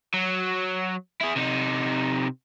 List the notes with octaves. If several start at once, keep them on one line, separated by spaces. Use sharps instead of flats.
F#3
E4 G#4
C3 D#4